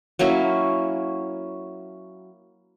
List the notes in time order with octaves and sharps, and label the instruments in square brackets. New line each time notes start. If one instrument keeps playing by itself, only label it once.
[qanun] F#3 A#3 C#4 E4